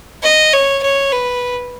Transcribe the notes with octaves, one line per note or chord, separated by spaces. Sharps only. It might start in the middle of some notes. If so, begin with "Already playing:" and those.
D#5
C#5
C#5
B4